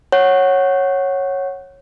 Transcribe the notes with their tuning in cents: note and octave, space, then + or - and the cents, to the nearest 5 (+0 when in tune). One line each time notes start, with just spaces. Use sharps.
C#5 -10 F#5 +0